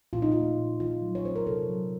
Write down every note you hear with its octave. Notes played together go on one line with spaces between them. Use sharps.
A#2 F4
D#4
A3 F4
A#2
D#3 F4
F#3
C#5
C#4 C5
A#4
C3 A4
F#3